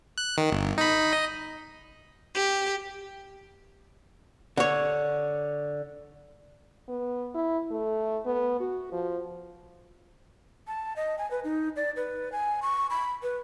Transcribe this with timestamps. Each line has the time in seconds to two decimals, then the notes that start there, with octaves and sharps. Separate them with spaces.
0.18 F#6
0.38 D#3
0.52 G1
0.78 D#4 B5
1.13 D#5
2.34 G4
4.57 D3 C#5
6.89 B3
7.35 E4
7.71 A3
8.26 B3
8.60 F#4
8.92 F3
10.67 A5
10.96 D#5
11.18 G#5
11.31 B4
11.44 D#4
11.76 D5
11.96 B4
12.32 G#5
12.62 C#6
12.90 B5
13.23 B4